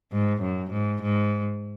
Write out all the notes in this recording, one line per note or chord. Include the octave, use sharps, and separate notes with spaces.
G#2
F#2
G#2
G#2